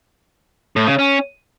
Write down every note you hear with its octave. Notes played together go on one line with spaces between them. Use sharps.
A2
C#3
C#4